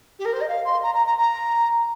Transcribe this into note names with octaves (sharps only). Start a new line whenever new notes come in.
G4
A#4
C5
D#5
F5
C6
A#5
A#5
A#5
A#5